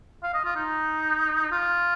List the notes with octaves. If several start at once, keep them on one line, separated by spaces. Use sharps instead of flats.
F5
D#5
F4
D#4
F4